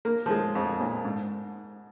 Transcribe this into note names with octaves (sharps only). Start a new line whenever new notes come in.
A#3
F3
G#3
F2
A#2
G#2